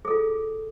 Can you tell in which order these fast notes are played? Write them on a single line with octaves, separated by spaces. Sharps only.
G#4 A4 F4